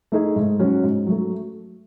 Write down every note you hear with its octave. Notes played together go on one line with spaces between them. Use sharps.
A3 D#4 G#4
G#2
F#3 C#4 F#4
G#2
F#3 A3